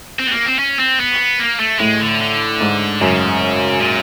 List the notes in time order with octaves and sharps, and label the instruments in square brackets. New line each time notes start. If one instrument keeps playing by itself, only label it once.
[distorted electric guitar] C4
B3
A#3
C4
C#4
C4
B3
A#3
A3
[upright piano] A2 [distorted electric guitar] G#3
[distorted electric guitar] D3
D3
[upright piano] G#2
[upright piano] F#2 [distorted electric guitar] C#3
[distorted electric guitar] A#2